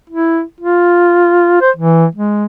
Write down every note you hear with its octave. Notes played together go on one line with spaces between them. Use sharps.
E4
F4
C5
E3
G#3